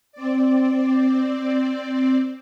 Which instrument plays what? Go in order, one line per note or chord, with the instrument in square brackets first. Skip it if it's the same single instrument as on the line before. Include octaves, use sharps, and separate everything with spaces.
[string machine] C4 D5